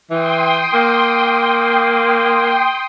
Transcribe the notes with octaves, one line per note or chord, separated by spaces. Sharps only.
E3 G5 C6 D#6
A#3